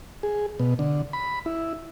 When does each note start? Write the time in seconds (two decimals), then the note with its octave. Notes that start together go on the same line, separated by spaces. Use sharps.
0.23 G#4
0.59 B2
0.79 D3
1.13 B5
1.46 E4